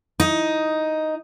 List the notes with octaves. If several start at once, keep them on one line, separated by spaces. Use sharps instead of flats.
D#4